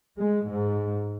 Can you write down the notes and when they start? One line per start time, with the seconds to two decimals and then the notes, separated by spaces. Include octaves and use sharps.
0.18 G#3
0.48 G#2